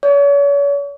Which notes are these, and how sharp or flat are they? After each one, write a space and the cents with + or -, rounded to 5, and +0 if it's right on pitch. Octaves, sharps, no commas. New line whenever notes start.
C#5 +40